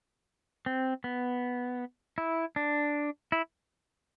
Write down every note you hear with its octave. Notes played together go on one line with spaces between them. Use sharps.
C4
B3
E4
D4
E4